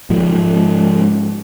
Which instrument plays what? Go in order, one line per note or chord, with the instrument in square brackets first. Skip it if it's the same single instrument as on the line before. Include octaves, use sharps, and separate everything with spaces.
[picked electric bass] G#2 F3 G#3